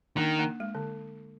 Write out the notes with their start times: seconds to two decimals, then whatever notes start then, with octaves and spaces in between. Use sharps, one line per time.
0.17 D#3 A#3 D4
0.39 A#3
0.60 G#3
0.75 D3